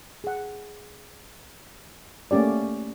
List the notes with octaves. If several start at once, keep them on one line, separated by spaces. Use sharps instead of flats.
G#4 F#5
A3 A#3 C#4 G4 D5